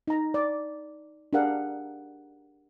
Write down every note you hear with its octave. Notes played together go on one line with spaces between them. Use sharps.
D#4 A#5
D5
D4 G4 G#4 A#4 F5 F#5